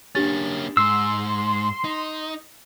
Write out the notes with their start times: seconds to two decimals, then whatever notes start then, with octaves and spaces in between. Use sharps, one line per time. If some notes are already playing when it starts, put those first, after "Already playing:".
0.15 A#3 C#4 D4 G4 A6
0.77 G#2 C6 E6 C7
1.85 D#4